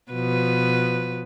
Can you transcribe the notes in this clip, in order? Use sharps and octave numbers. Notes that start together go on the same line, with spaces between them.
B2 F3 B4